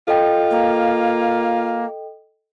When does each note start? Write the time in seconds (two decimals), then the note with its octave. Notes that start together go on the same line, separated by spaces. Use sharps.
0.08 F4 A4 D#5 G5
0.51 A#3